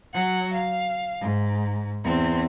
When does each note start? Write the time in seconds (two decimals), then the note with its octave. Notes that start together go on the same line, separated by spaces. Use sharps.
0.14 F#3 F#5
0.54 F5
1.21 G#2
2.05 E2 C4